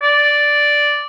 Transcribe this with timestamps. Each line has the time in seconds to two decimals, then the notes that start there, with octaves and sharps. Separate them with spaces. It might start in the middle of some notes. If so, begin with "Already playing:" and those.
0.02 D5